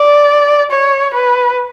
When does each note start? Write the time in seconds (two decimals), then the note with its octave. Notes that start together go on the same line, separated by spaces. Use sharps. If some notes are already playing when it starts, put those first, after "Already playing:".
Already playing: D5
0.71 C#5
1.14 B4